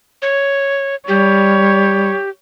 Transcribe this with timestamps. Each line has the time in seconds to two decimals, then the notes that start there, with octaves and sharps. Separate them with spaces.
0.22 C#5
1.08 G3 G4 C#5